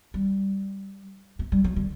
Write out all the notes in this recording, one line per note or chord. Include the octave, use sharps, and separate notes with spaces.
G3
A3
G3
F#3
D3